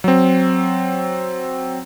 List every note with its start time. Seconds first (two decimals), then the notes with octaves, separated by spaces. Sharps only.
0.04 F#3 C4